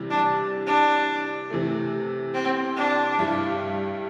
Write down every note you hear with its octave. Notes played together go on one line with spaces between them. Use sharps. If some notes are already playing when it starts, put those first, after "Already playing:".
Already playing: C3 E3 G3
D4
D4
C3 E3 A3
C4
D4
G2 G3 E4